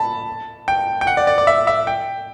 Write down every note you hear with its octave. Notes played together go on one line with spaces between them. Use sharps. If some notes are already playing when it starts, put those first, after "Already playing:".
Already playing: A5 B5
G5
G5
F#5
D5
D5
D5
E5
E5
G5